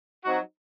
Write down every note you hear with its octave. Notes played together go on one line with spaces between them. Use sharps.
F#3 C4 D#4 F#4